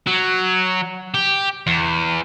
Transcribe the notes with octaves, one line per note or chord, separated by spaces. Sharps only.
F#3
G4
E2